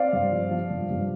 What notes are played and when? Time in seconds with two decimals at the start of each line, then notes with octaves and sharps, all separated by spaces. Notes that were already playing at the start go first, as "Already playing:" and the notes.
Already playing: C4 D5 F5
0.13 G2
0.31 F3
0.51 F3
0.70 G2
0.91 G2